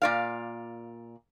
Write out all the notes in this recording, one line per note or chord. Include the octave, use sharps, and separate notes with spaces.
A#2 D5 F5